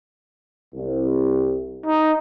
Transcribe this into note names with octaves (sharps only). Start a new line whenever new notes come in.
C2
D#4